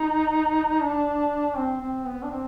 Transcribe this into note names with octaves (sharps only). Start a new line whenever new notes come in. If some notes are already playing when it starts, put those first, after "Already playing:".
Already playing: D#4
D4
C4
C4
B3
D4
C4